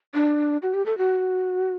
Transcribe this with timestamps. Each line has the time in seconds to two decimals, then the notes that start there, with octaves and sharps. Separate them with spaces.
0.14 D4
0.62 F#4
0.74 G4
0.86 A4
0.98 F#4